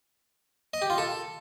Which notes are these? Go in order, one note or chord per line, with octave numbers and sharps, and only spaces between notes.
D#5
G4
F4
A4